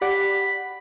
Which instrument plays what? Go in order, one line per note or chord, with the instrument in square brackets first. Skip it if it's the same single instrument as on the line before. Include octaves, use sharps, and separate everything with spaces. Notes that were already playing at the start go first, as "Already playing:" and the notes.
[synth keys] G4 D5 F#5 [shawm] B5